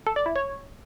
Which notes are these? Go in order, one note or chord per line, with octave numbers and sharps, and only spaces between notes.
A4
D5
E4
C#5